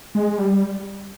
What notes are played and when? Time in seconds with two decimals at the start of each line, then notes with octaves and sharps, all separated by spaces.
0.15 G#3
0.38 G3